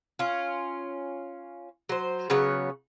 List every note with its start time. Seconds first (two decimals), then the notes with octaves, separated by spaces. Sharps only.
0.19 C#4 F4
1.89 F#3 C5
2.30 C#3 F#3 B3 C#5